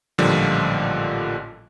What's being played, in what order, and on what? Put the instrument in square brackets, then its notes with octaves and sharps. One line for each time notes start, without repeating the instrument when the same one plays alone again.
[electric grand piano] A1 A#2 D3 F3 G3